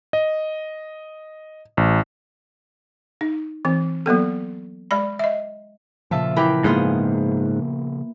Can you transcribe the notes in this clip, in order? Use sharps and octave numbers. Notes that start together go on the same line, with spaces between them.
D#5
A1
D#4
E3 C4
F#3 A#3 B3 A4
G#3 D5 B5
D#5 E5
A#2 C#3 F3 F4 E5 A5
E3 G4 A#4 G5 B5
G#2 A#3 B3 F4 G#4 D#6